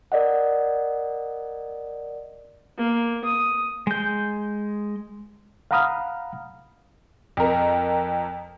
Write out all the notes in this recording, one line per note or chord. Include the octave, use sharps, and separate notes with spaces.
A#4 D5 D#5 F#5
A#3
D#6
G#3 G6
F5 F#5 A#5 B5 D#6 F6
F2 A#4